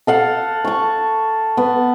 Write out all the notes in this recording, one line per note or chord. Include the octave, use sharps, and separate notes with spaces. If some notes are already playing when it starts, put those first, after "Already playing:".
A4 F5 F#5 A5
A5 C#6
B3